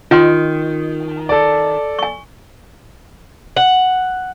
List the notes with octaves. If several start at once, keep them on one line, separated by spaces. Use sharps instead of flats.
D#3 F4 G5 C6
A4 D5
G#5 C#6
F#5